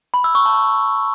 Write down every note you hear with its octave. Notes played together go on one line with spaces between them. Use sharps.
B5
E6
C#6
A5